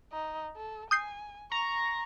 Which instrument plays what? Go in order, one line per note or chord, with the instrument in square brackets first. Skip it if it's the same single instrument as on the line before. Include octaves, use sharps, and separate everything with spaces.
[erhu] D#4
A4
[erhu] G#5 [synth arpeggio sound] D#6 G6 C7
[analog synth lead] A#5 [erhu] C#6